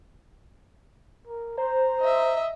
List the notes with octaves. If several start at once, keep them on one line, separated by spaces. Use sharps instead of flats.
A#4
C5 A#5
D#5 E5